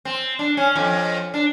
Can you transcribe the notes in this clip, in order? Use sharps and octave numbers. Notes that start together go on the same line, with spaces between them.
C4
D4
C#4
F2
D4